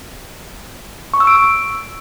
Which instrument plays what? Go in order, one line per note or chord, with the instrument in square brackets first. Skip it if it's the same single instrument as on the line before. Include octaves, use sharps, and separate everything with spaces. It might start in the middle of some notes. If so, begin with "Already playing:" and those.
[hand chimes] C#6
E6
D7